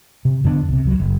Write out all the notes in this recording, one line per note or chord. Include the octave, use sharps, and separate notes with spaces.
C3
F2 D3 B3 D4
C2 C3
C#2 F#3
F#1